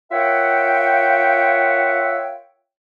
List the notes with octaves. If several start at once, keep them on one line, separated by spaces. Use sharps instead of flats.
F4 A#4 C#5 E5 F#5 G5